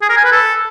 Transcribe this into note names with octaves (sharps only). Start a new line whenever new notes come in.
G#4
A#4
G#5
B4
A4